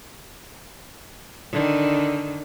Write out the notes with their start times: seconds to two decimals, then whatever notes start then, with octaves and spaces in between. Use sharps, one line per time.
1.52 D3 D#3